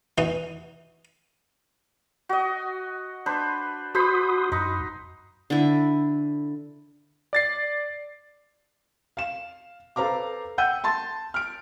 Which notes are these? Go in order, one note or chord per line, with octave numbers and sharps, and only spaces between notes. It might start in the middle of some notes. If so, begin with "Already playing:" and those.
E3 D#4 F#4
F#4 D#5
D4 B4 C5
F#4 B4 C5 B5 C6 D#6
F#2 D#4
D3 E4
D5 A6 C7
F5 E7
A4 B4 C5 F5 A#5 D6
F#5 G5 E6 G6 D#7
A5 C6 A6
F6 D7